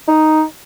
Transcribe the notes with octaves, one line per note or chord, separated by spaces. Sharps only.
D#4